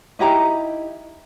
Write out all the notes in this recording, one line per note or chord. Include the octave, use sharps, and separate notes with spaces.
D#4 E4 G4 A#5